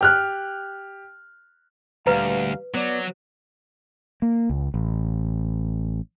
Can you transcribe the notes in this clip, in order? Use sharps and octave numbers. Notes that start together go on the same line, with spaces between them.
G4 F6 F#6
D2 A#2 G3 B4 F5 A#5
F#3 B3 D5
A#3
C#2
A1